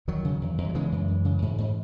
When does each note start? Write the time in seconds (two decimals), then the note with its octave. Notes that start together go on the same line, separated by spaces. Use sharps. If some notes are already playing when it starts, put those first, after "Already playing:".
0.08 E2 D#3 F#3
0.25 C#3
0.42 E2
0.58 E2
0.69 F#3
0.75 C#3 E3 G#3
0.92 F#2
1.08 F#2
1.25 C#3
1.42 G#2
1.58 G#2